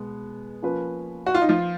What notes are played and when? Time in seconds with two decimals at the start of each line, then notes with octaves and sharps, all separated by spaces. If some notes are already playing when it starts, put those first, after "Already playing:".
Already playing: B2 G#3 B3
0.62 F3 A#3 C#4 F4 B4
1.26 F#4
1.35 F4
1.42 D#4
1.49 F3 F4